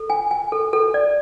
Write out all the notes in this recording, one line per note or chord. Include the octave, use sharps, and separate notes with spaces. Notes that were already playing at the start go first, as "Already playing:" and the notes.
Already playing: A4
G#5
G#5
A4
A4
D5